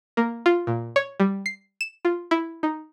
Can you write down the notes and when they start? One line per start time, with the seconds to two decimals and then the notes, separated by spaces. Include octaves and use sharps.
0.17 A#3
0.46 F4
0.67 A#2
0.96 C#5
1.20 G3
1.46 C7
1.81 E7
2.05 F4
2.31 E4
2.63 D#4